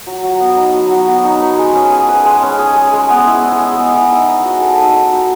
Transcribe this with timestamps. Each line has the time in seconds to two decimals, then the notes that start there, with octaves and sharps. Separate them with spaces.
0.07 F#3
0.23 F#3
0.40 B3
0.57 D#4
0.74 F#3
0.91 F#3
1.08 B3
1.25 D#4
1.41 B4
1.58 G#3
1.75 C#4
1.92 G#4
2.09 B4
2.25 G#3
2.42 C#4
2.59 G#4
2.76 G#3
2.93 G#3
3.10 B3
3.27 E4
3.43 G#3
3.60 G#3
3.77 B3
3.94 E4
4.11 D#4
4.28 D#4
4.44 F#4
4.62 A4
4.78 D#4
4.96 D#4
5.12 F#4